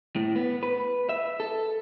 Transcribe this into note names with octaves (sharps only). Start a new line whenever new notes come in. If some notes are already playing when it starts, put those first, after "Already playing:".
A2
B3
B4
E5
A4